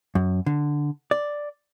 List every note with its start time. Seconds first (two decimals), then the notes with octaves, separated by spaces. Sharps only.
0.15 F#2
0.46 D3
1.11 D5